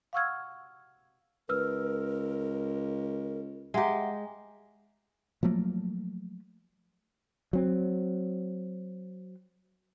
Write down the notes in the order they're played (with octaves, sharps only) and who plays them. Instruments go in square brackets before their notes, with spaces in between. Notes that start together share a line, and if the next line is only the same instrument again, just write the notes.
[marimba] F5 F#5 C#6 E6 F6 G#6
[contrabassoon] C#2 [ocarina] A#4 [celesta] B4 E6 F6
[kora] G#3 G4 [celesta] E5 F#5 A#5
[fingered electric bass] F3 F#3 A3 A#3
[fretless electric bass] F#3 C4